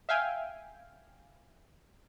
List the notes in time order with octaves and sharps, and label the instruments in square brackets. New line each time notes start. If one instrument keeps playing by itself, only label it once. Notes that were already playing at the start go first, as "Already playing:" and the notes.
[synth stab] E5 F5 G5 G#5